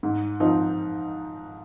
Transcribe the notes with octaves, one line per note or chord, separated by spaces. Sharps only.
G#2
F3 C4 D#4